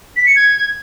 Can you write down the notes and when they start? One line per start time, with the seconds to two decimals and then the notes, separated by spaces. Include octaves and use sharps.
0.17 B6
0.26 C#7
0.36 G#6